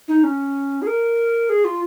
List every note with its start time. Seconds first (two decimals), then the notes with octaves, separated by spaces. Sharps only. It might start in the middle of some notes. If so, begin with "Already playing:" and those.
0.08 D#4
0.24 C#4
0.82 G#4
0.87 A#4
1.49 G#4
1.65 F4